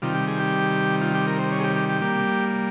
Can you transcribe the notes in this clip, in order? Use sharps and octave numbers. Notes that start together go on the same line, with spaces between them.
C3 D#3 G3 F4
G4
G#4
G4
F4
G4
A#4
C5
C#5
G#4
G4
G4
G4
G3 A#3